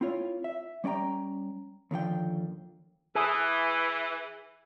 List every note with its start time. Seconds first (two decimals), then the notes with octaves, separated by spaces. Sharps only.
0.01 C4 E4 F4 C#5
0.44 E5
0.84 G3 C#4 D5 G5 A#5
1.91 D#2 D3 F3 G5
3.15 E3 G#4